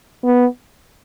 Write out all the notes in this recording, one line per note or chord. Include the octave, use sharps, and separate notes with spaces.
B3